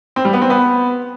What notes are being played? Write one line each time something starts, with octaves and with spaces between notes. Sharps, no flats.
C4
G3
B3
C4
B3